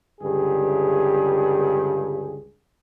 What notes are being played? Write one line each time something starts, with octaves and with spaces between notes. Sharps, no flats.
C#2 G2 D3 G4 G#4